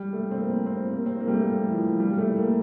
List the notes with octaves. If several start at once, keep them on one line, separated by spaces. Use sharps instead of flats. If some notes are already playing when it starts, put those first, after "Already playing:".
Already playing: G3
A3
C4
A#3
C4
A#3
C4
A#3
G3
A3
E3
F3
G3
G3
A3
A#3